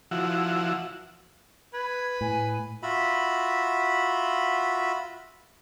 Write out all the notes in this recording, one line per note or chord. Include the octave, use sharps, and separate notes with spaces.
F3 E4 F#4
B4 G#6
A2 G#5
F4 F#4 E5 B5